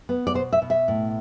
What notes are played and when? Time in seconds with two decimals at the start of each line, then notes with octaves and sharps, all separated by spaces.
0.09 B3
0.27 D5
0.34 B2 C5
0.53 E5
0.62 B2
0.70 E5
0.88 A2